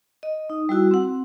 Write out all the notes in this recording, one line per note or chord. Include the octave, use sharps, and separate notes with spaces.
D#5
D#4
G3 E4 F#4 E6
C4 F#5